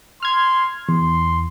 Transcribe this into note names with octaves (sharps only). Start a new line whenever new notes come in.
C6 F6 G#6
E2 C6